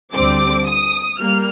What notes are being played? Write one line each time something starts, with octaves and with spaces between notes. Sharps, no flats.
D2 D3 G3 C4 D6
D#6
G3 A#3 F6